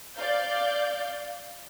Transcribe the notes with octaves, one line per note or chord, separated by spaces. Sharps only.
D5 F5 G6